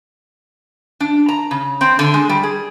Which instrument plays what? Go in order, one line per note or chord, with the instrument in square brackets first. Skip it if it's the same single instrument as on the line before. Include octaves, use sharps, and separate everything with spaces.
[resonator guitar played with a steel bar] D4
A#5
C#3
C4
D3
G#3
G3
G#4